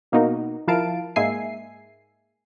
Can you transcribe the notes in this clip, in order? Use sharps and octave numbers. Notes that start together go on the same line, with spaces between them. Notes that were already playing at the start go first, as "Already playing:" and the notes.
B2 A#3 B3 D#4 F#4 A#4
F3 E4 A#4 F5 A5 D7
G#2 G#3 A#3 E5 G#5 C7